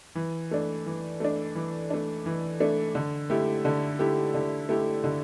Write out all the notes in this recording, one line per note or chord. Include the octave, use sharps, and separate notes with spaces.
E3
A3 D4
E3
A3 D4
E3
A3 D4
E3
A3 D4
D3
A3 E4 G4
D3
A3 E4 G4
D3
A3 E4 G4
D3